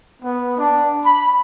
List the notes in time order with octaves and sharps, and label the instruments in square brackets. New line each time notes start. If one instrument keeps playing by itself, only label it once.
[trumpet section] B3
D4
B5